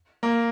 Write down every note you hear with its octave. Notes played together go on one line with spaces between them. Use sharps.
A#3